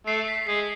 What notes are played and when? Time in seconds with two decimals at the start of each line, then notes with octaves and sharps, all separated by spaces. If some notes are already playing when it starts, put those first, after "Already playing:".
0.07 A3 C7
0.28 B6
0.47 G#3 C7